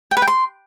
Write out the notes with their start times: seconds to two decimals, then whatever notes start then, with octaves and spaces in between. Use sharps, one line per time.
0.11 G5
0.17 B4
0.22 G5
0.27 C6